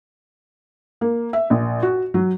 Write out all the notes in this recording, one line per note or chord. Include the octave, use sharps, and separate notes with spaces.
A#3
E5
A#1
F#4
F#3